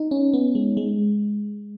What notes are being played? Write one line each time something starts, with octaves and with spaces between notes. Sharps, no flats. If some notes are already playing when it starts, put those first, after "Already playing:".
Already playing: D#4
C#4
B3
G#3
G#3